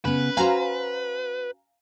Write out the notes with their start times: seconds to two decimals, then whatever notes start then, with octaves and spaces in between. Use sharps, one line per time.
0.05 C#3 B3 B4
0.37 C#4 F#4 C5 F5 G#5 A#5